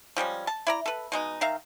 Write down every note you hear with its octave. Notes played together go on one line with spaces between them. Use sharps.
F3 G3 G#3 C#4
A5
E4 D5 A#5
A4 B4
B2 G#3 D#4
D#3 E5 F5 A#5